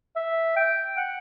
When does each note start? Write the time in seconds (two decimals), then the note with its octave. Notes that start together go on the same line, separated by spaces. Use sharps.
0.16 E5
0.56 G5
0.97 F#5